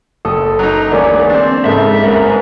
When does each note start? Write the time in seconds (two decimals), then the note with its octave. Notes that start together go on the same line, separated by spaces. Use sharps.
0.25 F#1 A4 D#6
0.59 F#3 D#4
0.92 D2 E3 G#3 A#3 C#4 D5
1.30 C4 D4
1.65 G#2 C#3 A#3 A4 E5
2.02 G1 G#2 A#4 B4